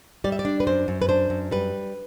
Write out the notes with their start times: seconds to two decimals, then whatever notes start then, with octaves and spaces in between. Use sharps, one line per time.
0.24 G3 D5
0.32 E5
0.39 D5
0.45 D4
0.60 B4
0.67 F#2 C5
0.88 F#2
1.02 B4
1.09 D4 C5
1.30 F#2
1.51 G3 B4